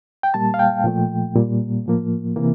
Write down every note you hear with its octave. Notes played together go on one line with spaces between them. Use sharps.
G5
A#2 G3 A#3 A5
F5
G5
A#2 F3 A3
A#2 G3 A#3
A2 F3 A#3
C3 E3 A#3